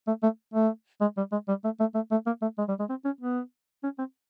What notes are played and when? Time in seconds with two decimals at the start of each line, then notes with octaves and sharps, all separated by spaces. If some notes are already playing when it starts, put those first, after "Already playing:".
0.07 A3
0.23 A3
0.54 A3
1.01 G#3
1.18 G3
1.32 G#3
1.48 G3
1.64 A3
1.80 A3
1.95 A3
2.12 A3
2.26 A#3
2.42 A3
2.58 G#3
2.69 G3
2.80 G#3
2.90 C4
3.05 C#4
3.21 B3
3.84 C#4
3.99 C4